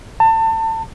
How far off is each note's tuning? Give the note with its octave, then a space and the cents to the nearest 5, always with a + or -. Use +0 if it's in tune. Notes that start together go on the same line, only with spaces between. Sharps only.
A5 +30